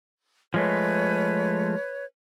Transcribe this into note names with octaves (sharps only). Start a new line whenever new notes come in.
F3 G#3 A3 B4 C#5